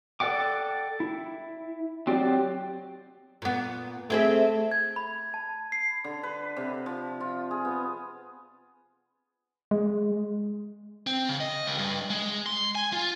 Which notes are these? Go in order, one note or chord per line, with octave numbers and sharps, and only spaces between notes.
A4 D5 F#5 G5 D6
E4
F#3 C4 G4 D5
A#2 B3
A3 C4 G#4 E5
G#6
B5
A5
C7
D3
B4
C3
F3
F4
G#4
B3
G#3
C4
C#3
D#5
C#2
G2
G#3
C6
G#5
F4